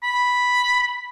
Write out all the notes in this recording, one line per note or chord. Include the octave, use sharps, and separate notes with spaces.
B5